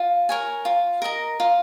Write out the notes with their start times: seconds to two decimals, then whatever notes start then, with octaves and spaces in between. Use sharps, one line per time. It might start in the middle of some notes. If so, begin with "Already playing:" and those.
Already playing: F4
0.29 A#4 C#5 G#5
0.65 F4
1.02 A#4 D#5 A#5
1.40 F4